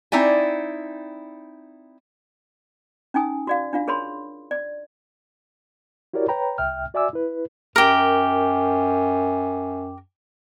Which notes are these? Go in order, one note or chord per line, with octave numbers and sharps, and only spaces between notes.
C4 D#4 E4 D5 G#5
C#4 D#4 G#5 D#6
F#4 D5 F5
D4 F4 F5
G#4 A#4 C#5 B5 C6
D5
E4 F#4 G4 A#4 C#5 D5
B4 C#5 G5 A#5 B5
C2 E5 G5 F6
F#4 D5 E5 G#5 D6 E6
E4 B4
F#2 G4 A#4